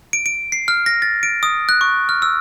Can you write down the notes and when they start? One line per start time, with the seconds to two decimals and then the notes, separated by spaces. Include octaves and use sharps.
0.13 D7
0.26 D7
0.52 C7
0.68 F6
0.86 A#6
1.02 A6
1.23 D7
1.43 D#6
1.69 F#6
1.81 C#6
2.09 F6
2.22 E6